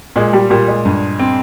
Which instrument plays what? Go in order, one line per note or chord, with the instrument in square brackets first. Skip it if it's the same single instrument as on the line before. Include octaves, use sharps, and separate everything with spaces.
[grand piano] A#2 [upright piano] G#3
[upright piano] G3
[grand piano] A#2 [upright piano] G3
[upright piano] G#3
[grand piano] G2
C4